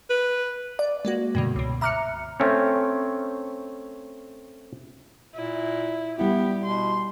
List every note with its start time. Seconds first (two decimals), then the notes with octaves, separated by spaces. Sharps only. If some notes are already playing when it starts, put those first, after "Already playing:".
0.10 B4
0.79 D5
1.05 G#3 A#3 F#4
1.35 G2 B2 D3
1.56 C#2 B2
1.81 E5 A#5 D6 F6 F#6 C#7
2.40 A3 C4 C#4 C#5
5.35 A#2 E4
6.19 G3 B3 E4 G4
6.65 B2 C6